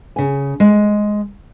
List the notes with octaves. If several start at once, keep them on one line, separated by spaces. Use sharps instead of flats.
C#3 G#5
G#3